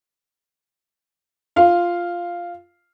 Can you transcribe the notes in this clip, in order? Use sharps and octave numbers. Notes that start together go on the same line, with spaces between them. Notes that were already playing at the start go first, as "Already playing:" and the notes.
F4 F5